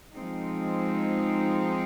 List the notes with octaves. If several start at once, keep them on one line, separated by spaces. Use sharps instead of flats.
F3 G#3 C4 D#4